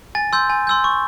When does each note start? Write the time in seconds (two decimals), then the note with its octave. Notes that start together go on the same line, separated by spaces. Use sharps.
0.15 G#5 A6
0.33 C6 E6 G6
0.50 G#5
0.67 C6 E6 G6
0.84 C#6